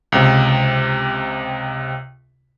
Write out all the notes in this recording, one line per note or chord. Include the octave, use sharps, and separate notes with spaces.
C#2 C3